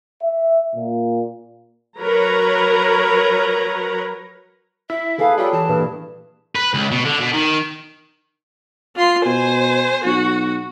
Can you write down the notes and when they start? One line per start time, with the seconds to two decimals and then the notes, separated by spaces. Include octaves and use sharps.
0.23 E5
0.76 A#2
1.99 F#3 A#4 B4 C#5 A#5
4.90 E4 E5
5.19 G#4 A4 B4 F5
5.38 F#3 G3 E4 F4
5.53 E3 A5
5.69 G2 A#2
6.55 B4
6.74 C#2
6.91 B2
7.05 D3
7.20 B2
7.33 D#3
8.96 F4 C6
9.26 B2 C5 G#5
10.04 B1 F#4